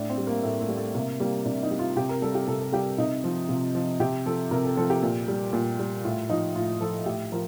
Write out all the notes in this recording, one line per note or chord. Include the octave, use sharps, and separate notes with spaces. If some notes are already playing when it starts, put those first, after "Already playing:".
Already playing: A2 D4
C4
G3
A#3
A2 A3
A3
G3
A3
C3 A#3
G3 A#3
C3 D4
D#4
G3
F4
C3 G4
A#4
G3 A4
G4
C3 A4
A4
G3 G4
C3 D#4
F3
C3
F3
C3 G4
F3 A4
C3 A#4
A4
F3 A4
G4
A#2
G3
A#2
G3
A2 F4
F3 D#4
A2 F4
F3 A4
A2 G4
F3 A#4